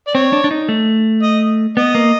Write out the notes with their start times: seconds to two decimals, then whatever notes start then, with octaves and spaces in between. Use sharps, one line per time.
0.07 D5
0.15 C4 C#5
0.33 D4
0.44 D4
0.51 D#4
0.69 A3
1.23 D#5
1.77 B3 D#5
1.95 A#3